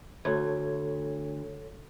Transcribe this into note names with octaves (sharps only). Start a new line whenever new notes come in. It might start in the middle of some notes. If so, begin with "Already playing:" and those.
D2 A4 C#5 G#6